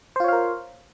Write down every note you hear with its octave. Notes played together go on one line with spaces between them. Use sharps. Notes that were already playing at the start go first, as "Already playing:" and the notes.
F4 A#4 C5 C#5 F5